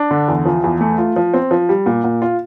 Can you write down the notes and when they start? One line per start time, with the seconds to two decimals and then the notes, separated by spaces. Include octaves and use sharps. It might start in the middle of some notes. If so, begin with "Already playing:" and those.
Already playing: D4
0.11 D3
0.28 E2
0.45 F3
0.64 E2
0.81 A3
0.98 F4
1.16 F3
1.34 C4
1.51 F3
1.69 G3
1.86 A#2
2.04 A#2
2.22 F4